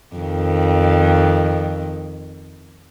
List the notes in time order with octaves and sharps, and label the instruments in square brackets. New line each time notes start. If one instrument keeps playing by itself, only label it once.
[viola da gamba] F2 D#3